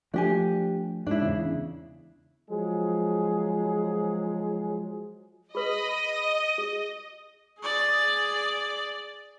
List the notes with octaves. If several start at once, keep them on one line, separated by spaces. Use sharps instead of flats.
F3 A3 D4 G4 G#5
G#2 D4 E4
E2 C#3
F3 F#3 G#3 G#4
G#4 B4 D#5 B5
D#7
G#4
G#4 D5